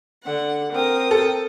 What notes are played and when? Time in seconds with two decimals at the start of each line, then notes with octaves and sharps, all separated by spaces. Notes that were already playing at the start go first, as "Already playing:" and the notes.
0.23 D3 F#5
0.72 C4 A#4 D#6
1.11 A4